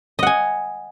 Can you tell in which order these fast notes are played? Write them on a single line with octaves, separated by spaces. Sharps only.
D#5 F#5 G#5